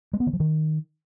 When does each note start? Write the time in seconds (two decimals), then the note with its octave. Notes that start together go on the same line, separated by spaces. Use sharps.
0.13 G#3
0.20 B3
0.27 D#3
0.33 F3
0.40 D#3